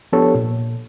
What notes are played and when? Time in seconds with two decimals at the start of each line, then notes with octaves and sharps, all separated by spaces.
0.12 F3 B3 D4 G4 A4 C#5
0.34 A#2